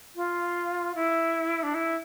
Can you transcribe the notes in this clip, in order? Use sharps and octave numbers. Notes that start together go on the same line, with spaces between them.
F4
E4
D4
E4